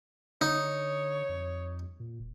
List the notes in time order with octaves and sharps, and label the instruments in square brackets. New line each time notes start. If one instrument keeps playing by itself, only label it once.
[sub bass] D3 [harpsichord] D#4 [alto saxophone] C#5
[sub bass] F2
A#2
E1